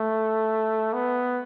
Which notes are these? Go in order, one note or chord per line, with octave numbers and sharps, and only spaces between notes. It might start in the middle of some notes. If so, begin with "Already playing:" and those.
Already playing: A3
B3